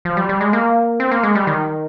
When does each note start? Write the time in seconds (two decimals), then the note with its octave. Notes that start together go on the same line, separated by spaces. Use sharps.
0.05 F3
0.17 G3
0.29 G3
0.41 G#3
0.53 A#3
1.00 C4
1.12 A#3
1.23 G#3
1.35 G3
1.47 D#3